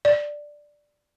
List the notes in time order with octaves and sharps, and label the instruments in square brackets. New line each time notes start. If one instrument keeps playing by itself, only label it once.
[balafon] D5